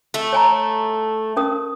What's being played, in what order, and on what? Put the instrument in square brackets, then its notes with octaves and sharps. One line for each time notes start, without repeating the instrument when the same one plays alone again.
[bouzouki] A3
[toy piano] C#5 G#5 A#5
C#4 A#4 D#6